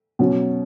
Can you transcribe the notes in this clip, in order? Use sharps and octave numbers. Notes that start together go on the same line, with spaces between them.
B2 F#3 C#4